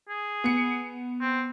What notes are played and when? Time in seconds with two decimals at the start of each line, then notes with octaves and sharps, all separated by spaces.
0.09 G#4
0.44 B3 C#7
1.21 C4